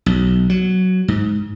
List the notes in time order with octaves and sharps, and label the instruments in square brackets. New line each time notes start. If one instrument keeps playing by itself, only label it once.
[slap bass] B1
F#3
G#2